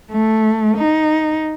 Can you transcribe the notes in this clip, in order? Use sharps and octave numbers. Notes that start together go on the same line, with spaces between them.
A3
D#4